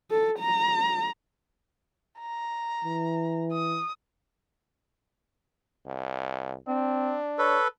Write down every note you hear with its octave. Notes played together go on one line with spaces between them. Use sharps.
A4
A#5
A#5
E3
D#6
C2
C4 D4
A4 B4 C#5